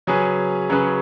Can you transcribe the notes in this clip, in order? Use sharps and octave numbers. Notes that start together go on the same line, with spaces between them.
C#3 F#3 C#4 G#4 B4
C#3 F#3 C#4 G#4 B4